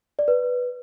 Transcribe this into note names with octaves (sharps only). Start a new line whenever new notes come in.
D5
B4